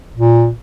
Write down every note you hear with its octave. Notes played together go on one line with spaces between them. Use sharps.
A#2